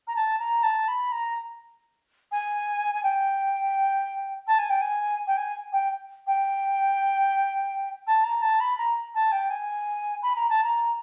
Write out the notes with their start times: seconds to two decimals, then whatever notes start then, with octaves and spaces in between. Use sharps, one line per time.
0.08 A#5
0.16 A5
0.39 A#5
0.63 A5
0.88 B5
1.12 A#5
2.32 G#5
2.95 G#5
3.03 G5
4.47 A5
4.59 G#5
4.70 G5
4.82 G#5
5.27 G5
5.37 G#5
5.73 G5
6.27 G5
8.07 A5
8.24 A#5
8.42 A5
8.60 B5
8.78 A#5
9.15 A5
9.32 G5
9.50 G#5
10.23 B5
10.36 A#5
10.50 A5
10.64 A#5